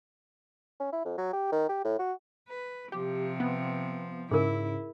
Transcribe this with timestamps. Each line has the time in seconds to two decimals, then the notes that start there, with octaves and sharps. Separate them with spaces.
0.80 C#4
0.92 E4
1.05 F2
1.18 F#3
1.33 G4
1.52 D#3
1.69 G4
1.85 A2
1.99 F#4
2.48 B4
2.92 C3 F3 G4
3.40 B3
4.31 G#2 C#3 E4 G#4 A#4